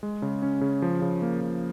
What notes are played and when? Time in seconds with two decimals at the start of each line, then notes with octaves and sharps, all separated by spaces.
0.03 G#3
0.22 C#3
0.42 C#4
0.61 C#3
0.82 F3
1.02 C#3
1.22 A#3
1.41 F3